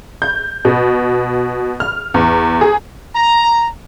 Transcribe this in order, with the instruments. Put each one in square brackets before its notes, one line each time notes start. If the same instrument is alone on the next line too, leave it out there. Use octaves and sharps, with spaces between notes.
[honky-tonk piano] G6
B2
F6
E2
G#4
[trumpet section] A#5